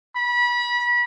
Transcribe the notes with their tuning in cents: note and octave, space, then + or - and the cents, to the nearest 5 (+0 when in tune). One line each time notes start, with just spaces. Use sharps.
B5 -30